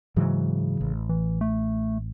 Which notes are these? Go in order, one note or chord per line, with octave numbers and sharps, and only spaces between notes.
G#2 C#3 E3 F#3
A1
E3
A3